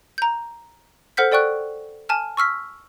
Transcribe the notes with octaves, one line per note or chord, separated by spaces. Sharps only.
A#5 G6
A4 C5 F#5 F6 G6 B6
A4 D5 G5 C#6 F#6
G#5 A5 F6
C#6 E6 F6 B6